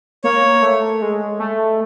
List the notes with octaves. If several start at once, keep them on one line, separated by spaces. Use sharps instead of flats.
A#3 C#5
A3
G#3
A3